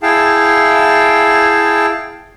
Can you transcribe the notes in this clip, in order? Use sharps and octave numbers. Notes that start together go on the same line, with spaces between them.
E4 G#4 F5 G5 A5